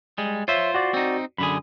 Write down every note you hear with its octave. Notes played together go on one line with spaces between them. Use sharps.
G3 G#3
F4 C5 C#5 E5
F#4 D5
C4 D#4
F#2 D3 G#4 B5